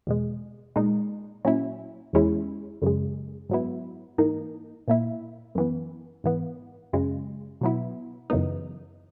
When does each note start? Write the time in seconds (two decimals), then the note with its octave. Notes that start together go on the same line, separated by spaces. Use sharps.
0.07 E2 B2 G#3
0.76 A#2 G#3 D#4
1.45 A#2 F#3 C#4 E4
2.13 E2 B2 G#3 C#4 E4
2.82 F#2 C#3 G#3
3.49 G#2 F#3 B3 E4
4.18 G#2 E3 A#3 D#4
4.88 A#2 A#3 E4
5.55 F#2 E3 B3
6.24 G#2 E3 B3
6.93 F#2 C#3 G#3
7.61 B2 F#3 B3 E4
8.30 F#2 C#3 E3 B3 D#4